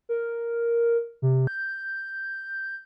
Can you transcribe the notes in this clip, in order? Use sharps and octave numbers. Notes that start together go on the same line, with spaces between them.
A#4
C3
G6